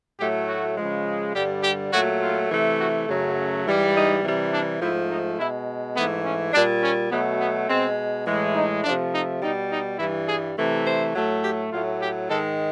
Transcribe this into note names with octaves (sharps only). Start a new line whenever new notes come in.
A2 F#3 A3 G4
F#4
C#3 F3 G#3
G2 D3 G3 G4
G4
A#2 F#3 A3 F#4
F4
C3 E3 A3
F#4
F#2 C#3 F#3 A3
G#2 E3 G3
D#4
C3 E3 G3
D4
G#2 F3 A3 E4
D#4
B2 G#3 E4
G#2 E3 A3 B3
C#4
A#2 G3 D4
C#4
B2 F#3 A3 B3
B3
B2 G#3 C4
A2 E3 G#3
D#4
C3 F3 A3 D4
D#4
B2 G3 D#4
D#4
G2 E3 G3 E4
G#4
C3 E3 A3
C5
A2 F#3 A3
G4
A2 F#3 A3 F4
G4
G#2 D#3 G#3 A4